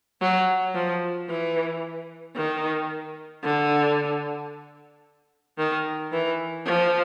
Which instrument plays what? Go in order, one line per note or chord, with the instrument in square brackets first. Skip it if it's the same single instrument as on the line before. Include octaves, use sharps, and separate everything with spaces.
[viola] F#3
F3
E3
D#3
D3
D#3
E3
F3